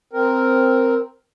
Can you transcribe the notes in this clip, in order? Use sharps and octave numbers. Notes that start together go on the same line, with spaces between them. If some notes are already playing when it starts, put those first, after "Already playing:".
C4 A#4